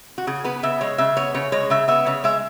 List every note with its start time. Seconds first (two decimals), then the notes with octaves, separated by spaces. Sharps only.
0.18 F#4
0.27 C#3 G#4
0.44 B3 B4
0.63 C#3 E5
0.81 G#3 C#5
0.98 C#3 E5
1.17 B3 C#5
1.34 C#3 C#5
1.52 G#3 C#5
1.70 C#3 E5
1.88 B3 E5
2.06 C#3 C#5
2.24 G#3 E5